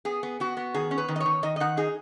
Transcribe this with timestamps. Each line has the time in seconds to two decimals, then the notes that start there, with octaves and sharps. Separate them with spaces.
0.05 B3 G#4
0.23 B3
0.40 B3 F#4
0.57 B3
0.74 D#3 G#4
0.91 C#4
0.98 B4
1.08 D#3
1.16 D#5
1.20 C#5
1.26 D#3
1.43 D#3 D#5
1.56 D#5
1.60 D#3 F#5
1.77 D#4 G#4